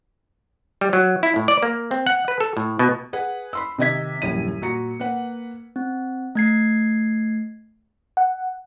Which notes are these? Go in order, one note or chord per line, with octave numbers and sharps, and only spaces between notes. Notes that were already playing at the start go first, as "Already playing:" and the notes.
G3
F#3
E4
A2
D5
A#3
C4
F#5
B4
A4
A2
B2
G#4 B4 F#5
B5 C6 E6
C3 D#3 D#5 E5 G#6 B6
D#1 A#1 F#2 E4 D#7
A#2 F#4 A#5 C#7
A#3 B4 F#5
C4
A3 G#6 C7
F#5